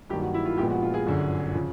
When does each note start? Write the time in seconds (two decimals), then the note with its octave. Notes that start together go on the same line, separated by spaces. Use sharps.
0.10 G2 D#3 F#3 A#3 G4
0.22 F#4
0.34 E4
0.45 F4
0.58 A#1 A#2 F3 G#3 B3 G4
0.70 F#4
0.82 F4
0.94 G#4
1.06 G1 F#2 D3
1.55 C#3 F3